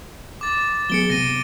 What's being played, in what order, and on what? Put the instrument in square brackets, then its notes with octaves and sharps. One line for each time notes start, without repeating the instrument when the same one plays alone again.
[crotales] D6 A6
[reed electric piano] F#3 B3 G#4 [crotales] C#7 D7 G7
[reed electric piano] C3 B3 [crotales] A#6 D#7